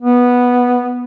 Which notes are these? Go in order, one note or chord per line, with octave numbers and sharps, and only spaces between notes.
B3